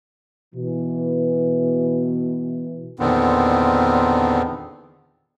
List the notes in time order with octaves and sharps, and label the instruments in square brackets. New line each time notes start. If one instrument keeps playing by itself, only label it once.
[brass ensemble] B2 E3
[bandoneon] E2 A#2 D3 D#3 B3 C4